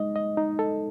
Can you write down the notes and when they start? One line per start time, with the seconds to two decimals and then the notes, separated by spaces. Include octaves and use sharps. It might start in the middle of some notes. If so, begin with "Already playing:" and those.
Already playing: G#3 D#4 D#5
0.16 D#5
0.37 D#4
0.59 A4